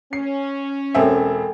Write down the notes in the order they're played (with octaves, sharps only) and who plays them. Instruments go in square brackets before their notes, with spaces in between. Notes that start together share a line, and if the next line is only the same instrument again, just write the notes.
[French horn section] C#4 [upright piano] C7
[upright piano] E1 C4 E5 [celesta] A4 G5 G#5